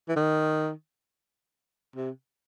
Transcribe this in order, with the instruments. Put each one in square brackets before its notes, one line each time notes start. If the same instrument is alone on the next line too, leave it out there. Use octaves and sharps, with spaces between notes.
[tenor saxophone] E3
D#3
C3